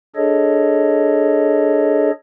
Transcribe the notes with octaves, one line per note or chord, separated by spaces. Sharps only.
D4 G#4 A4 C#5 D#5